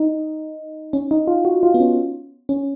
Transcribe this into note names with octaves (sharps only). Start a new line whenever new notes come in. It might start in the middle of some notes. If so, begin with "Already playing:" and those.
Already playing: D#4
C#4
D#4
F4
F#4
F4
B3
C#4
C#4